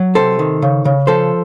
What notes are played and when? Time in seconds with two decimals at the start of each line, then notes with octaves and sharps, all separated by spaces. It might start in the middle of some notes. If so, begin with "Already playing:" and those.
Already playing: F#3
0.15 C3 A4 C5
0.39 D#3
0.62 C#3
0.85 C#3
1.07 F3 A4 C5